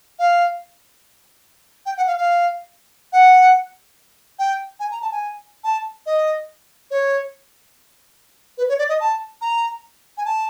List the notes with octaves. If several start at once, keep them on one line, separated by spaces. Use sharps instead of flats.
F5
G5
F#5
F5
F5
F#5
G5
G#5
A#5
A5
G#5
A5
D#5
C#5
B4
C#5
D5
D#5
A5
A#5
G#5
A5